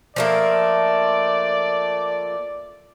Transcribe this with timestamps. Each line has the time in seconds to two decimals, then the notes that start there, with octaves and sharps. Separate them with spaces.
0.16 F3 A3 A#3 D5